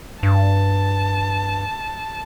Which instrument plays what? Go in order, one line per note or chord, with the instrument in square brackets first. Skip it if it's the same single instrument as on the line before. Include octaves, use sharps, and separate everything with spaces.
[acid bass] G2 [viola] A5